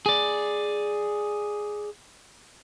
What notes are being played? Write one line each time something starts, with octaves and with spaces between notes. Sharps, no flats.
G#4 D5